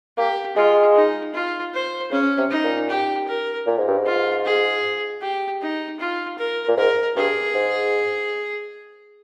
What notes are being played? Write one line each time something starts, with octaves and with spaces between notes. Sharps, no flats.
A#3 G4
G#3 F4
D#4
F4
C5
C#3 C#4
C3
D#4
A#2
G4
A#4
A#2
G#2
G2
G#2
F4
G#4
G4
D#4
F4
A#4
A#2
G#2 A#4
G2 G#4
G#2